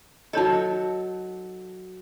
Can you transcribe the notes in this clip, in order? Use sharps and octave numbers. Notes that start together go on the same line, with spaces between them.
F#3 D#4 A4 C#5 D#5